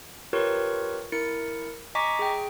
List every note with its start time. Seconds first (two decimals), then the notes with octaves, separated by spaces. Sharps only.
0.33 F4 G4 A#4 B4 C#5 C#6
1.12 E4 A#4 C#7
1.95 D#5 G#5 A#5 C#6 D6 B6
2.19 G#4 G5